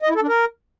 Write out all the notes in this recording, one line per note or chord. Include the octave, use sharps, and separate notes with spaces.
D#5
E4
A4
D4
A#4